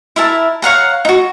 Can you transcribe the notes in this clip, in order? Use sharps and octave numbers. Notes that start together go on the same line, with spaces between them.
E4 A#4 E5 A5
C#5 F5 F#5 A#5
D#4 F#4